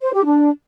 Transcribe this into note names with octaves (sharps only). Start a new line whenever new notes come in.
C5
G4
D4